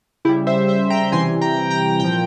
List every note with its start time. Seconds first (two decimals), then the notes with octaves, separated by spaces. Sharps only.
0.25 C#3 E4 G4
0.29 G3
0.47 C5 E5
0.68 C5 E5
0.90 G5 A#5
1.12 C3 E3 G3 G#5 C6
1.41 G5 A#5
1.70 G5 A#5
1.99 A#2 F3 G5 A#5